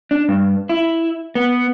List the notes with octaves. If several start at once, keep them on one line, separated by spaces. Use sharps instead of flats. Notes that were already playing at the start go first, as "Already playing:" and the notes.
D4
G2
E4
B3